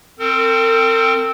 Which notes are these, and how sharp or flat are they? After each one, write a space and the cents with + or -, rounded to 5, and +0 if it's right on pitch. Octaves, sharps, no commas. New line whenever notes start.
C4 +0 A#4 -45